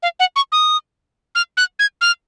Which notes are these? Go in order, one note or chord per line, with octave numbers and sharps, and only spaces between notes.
F5
F#5
C#6
D#6
F6
F#6
G#6
F6